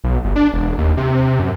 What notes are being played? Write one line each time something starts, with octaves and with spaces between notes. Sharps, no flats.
B1
G1
D4
E1
D#2
C3
F#2